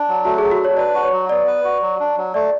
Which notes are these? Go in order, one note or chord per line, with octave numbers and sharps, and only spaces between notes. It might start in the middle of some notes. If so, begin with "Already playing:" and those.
Already playing: D4
F#3
A3 F#4
F#3 G#4
F#4
D4 C#5
B4 D5
F#4
C#5
F#3
B3 D5
B4
F#4
F#3
D4
F#3
A3 D5